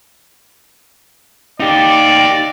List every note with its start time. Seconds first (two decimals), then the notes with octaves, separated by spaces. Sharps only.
1.60 D#4 G4 D5